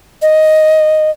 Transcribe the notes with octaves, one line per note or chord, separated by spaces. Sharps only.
D#5